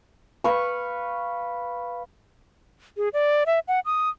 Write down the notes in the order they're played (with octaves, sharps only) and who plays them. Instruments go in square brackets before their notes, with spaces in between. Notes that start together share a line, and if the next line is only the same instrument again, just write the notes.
[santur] B4 F5 C#6
[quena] G#4
D5
E5
F#5
D#6